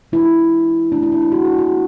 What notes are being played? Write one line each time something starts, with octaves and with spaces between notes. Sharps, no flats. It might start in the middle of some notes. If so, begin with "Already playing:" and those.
E3 G#3 D4 E4
E3 A3 C#4 D4
E4
D4
E4
F#4
G#4
E4
F#4
E3 B3